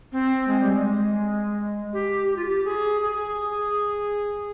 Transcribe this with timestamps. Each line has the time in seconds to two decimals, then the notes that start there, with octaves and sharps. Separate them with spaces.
0.12 C4
0.48 G#3
0.61 G3
0.72 G#3
1.93 G4
2.29 G4
2.36 F4
2.45 G4
2.65 G#4
3.01 G#4